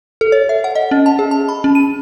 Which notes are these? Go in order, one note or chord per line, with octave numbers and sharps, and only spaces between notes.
A4
C#5
E5
F#5
D#5
C#4
A5
G#4
A5
B5
C#4
D#7